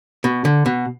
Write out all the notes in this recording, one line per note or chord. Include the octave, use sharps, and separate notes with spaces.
B2
D3
B2